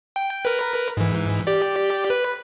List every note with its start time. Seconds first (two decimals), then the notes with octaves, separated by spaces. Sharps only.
0.16 G5
0.45 A#4 B4
0.97 G#2 E3
1.47 G4 D5
2.10 B4